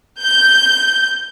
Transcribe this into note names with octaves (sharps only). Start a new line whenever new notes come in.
G6